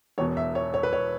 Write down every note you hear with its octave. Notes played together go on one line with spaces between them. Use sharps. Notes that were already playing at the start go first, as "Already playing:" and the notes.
E1 E2 B2 C#5
E5
C#5
C#5
B4
C#5